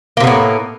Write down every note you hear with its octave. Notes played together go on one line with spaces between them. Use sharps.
A2 C3 A#3 B3